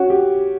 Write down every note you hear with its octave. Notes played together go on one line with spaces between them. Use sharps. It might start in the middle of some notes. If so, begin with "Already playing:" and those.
Already playing: C#4 F#4
G4